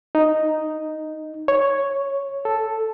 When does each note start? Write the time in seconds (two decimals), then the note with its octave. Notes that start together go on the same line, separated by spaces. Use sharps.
0.15 D#4
1.48 C#5
2.45 A4